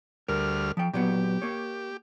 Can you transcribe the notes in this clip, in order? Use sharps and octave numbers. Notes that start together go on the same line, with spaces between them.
D2 G3 A#4 F6
F3 G5
A#2 F#3 B3 G4
A#3 C#5